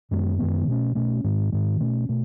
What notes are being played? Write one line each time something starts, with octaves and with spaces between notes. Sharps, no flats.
F#2 D#3 G#3 B3
F#2 D#3 G#3 B3
B2 A3 C#4
B2 A3 C#4
G#2 D#3 G#3
G#2 D#3 G#3
B2 A3 C#4
B2 A3